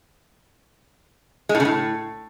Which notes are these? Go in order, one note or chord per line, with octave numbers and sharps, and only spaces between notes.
G#3
A2
C#3
A2